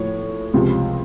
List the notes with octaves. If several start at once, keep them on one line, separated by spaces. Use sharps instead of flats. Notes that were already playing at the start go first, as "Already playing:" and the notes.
Already playing: A2 F3 C#5
C#2 C3 F3